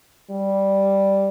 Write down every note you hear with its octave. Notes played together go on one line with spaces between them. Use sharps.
G3